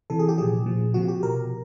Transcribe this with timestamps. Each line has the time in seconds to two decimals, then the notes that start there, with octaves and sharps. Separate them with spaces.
0.10 C3 E3 A4
0.19 G#4
0.29 G4
0.38 A#2 F3 G#4
0.66 A#2 F3
0.94 C3 F3 F#4
1.08 G4
1.23 B2 A#4